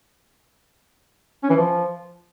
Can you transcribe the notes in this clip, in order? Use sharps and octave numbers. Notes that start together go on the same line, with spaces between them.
C#4
E3
F3